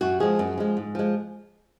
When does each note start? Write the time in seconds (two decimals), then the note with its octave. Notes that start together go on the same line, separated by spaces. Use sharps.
0.01 F#2 F#4
0.20 F3 G#3 G#4
0.39 F#2
0.58 F3 G#3
0.77 G#2
0.95 F3 G#3